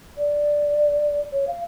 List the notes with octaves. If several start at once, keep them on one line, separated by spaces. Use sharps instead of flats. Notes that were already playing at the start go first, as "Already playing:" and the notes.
D5
C#5
F5